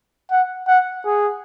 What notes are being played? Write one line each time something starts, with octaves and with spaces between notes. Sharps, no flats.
F#5
F#5
G#4